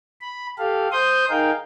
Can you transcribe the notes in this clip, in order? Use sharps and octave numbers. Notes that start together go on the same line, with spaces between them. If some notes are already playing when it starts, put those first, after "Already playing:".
B5
G4 A4 F5
C5 C6 D#6 G6
D#4 G#4 A#4 F5 G5